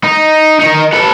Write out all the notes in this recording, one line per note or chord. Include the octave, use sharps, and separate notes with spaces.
D#4
D#3 D#4
A4 B4